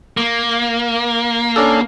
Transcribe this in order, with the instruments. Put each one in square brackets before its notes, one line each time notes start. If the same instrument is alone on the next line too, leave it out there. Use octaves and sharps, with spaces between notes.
[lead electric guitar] A#3
[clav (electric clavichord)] C#4 D4 A4